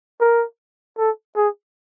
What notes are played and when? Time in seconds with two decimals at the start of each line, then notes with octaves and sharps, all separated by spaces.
0.21 A#4
0.98 A4
1.36 G#4